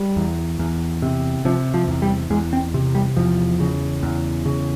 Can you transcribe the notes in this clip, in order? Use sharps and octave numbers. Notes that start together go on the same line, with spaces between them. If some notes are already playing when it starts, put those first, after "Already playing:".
Already playing: G3
E2
E2
C3
C3 F3
F3
E2
G3
E2 G#3
C4
C3
G3
E2 F3
C#3
E2
C#3